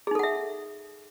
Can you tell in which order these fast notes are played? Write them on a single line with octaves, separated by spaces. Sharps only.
G#4 D#4 A4 F#5 E5